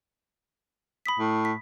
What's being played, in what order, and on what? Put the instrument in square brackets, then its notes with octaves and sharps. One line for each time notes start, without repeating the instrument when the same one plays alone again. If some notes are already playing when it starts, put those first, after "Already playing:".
[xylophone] B5 D#6 B6
[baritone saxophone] A2
[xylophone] B6